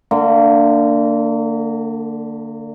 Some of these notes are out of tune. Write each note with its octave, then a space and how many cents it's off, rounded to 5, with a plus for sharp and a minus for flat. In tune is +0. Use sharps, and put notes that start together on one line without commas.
D3 +5 A#3 -35